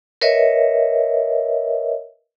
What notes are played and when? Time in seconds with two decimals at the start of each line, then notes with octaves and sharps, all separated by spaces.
0.21 A#4 B4 C#5 D#5 E5